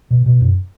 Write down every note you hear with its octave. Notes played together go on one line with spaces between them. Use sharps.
B2
B2
F#2